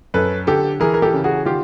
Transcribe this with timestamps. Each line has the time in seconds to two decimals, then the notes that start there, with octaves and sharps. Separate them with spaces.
0.14 F#2 A4 B4
0.47 D3 G4 A4
0.80 E3 G#4 A#4
0.94 A#4
1.02 G4 A4
1.14 C#3
1.24 F#4 G#4
1.45 D#3 F4 G4